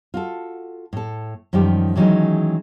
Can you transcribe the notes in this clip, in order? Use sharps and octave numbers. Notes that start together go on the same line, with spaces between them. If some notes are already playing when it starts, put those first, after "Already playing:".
F4 F#4 A4
A2 A4
F#2 D#3 F3 G3 G4
D#3 E3 F#3 G#3 C#4 D#4